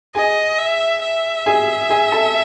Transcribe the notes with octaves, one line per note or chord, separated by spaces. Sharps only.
G#4 D#5 G#5
E5
E5
G#4 G#5
G#4 G#5
A4 A5